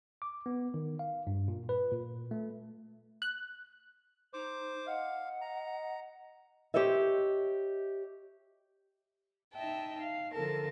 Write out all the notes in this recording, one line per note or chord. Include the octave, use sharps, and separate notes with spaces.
D6
B3
D#3
F5
G2
A#2
B4
A#2
A3
F#6
D#4 C5 D6
D#5 F5 F#5
A#5
G4 C5 C#5 D#5 E5
D#4 E5 G5 A5
F5
D3 F3 A4 A#4 A5